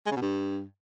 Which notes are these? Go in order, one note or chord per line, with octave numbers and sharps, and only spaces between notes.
G#3
C#3
B2
G2